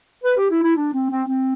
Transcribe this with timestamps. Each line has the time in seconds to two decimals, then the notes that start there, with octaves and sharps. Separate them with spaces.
0.24 B4
0.38 G4
0.51 E4
0.63 E4
0.76 D4
0.94 C4
1.11 C4
1.28 C4